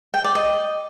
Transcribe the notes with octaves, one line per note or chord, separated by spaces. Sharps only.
G5
D5
D#5